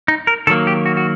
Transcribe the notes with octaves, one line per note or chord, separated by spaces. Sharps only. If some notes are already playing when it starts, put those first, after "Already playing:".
D#4
A#4
D#3 F#3 A#3 A4
G4
F#4
F#4